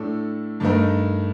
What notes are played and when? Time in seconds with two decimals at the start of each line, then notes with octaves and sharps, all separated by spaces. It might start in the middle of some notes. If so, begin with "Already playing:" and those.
Already playing: A2 A3 D4 A4
0.60 G2 D#3 A3 D#4 A#4